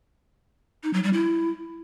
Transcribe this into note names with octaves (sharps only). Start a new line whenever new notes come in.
D#4
F#3
G3
E4